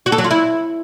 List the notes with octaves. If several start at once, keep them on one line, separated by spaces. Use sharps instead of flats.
F#4
A4
F#3
F4
E4